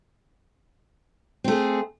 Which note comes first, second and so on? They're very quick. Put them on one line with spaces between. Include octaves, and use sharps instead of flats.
C4 A3 G#4